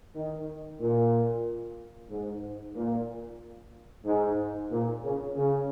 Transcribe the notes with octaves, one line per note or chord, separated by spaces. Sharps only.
D#3
A#2
G#2
A#2
G#2
A#2
C#3
C#3